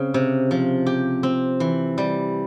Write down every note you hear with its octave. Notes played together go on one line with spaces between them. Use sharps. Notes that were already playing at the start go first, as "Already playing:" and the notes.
Already playing: C#3 C4
C3
F3
G4
C4
E3
G3